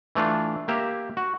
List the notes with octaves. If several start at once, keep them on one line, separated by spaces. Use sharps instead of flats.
E3 A3 D4 F4
A#3 G4 E5 A#5
F#4